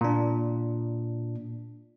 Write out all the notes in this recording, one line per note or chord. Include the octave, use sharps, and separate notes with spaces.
A#2 D4